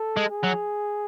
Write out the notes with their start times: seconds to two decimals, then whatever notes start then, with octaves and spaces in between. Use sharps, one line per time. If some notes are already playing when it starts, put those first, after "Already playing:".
Already playing: A4
0.17 G#3
0.30 G#4
0.43 F#3